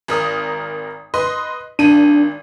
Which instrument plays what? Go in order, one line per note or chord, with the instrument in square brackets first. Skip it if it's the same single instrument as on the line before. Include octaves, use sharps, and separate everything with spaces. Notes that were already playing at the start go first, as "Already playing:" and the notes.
[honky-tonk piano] G#1 A#4 D#6
B4 D#5 C6
[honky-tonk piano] G#1 D#7 [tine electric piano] D4